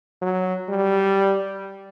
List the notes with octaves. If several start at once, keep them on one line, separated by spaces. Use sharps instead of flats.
F#3
G3